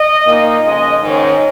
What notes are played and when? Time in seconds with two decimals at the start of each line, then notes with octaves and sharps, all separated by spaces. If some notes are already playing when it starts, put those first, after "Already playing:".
Already playing: D#5
0.26 A#2 A#3 D#4
0.63 F2 C#3 G#3 D#5
1.02 G#2 D#3 C#4